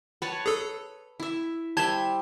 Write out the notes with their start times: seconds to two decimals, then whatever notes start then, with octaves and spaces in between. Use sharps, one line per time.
0.22 B4 C#5 A5
0.46 G#4 A4
1.20 E4 E5
1.77 G3 C5 E5 A5 G#6